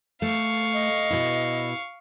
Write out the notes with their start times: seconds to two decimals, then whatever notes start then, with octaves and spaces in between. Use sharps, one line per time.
0.22 A3 F5 C#6
0.74 D#5
1.11 B2 E4